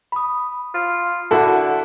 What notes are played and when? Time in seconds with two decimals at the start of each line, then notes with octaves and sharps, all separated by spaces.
0.12 B5 D#6
0.74 F4
1.31 D3 E4 F#4 A4